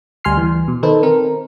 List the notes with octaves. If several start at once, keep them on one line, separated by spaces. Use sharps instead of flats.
D2 G3 G#5 C6 F6 C7
E3
B2
D#3 D#4 A4 B4 C5
C4 A#4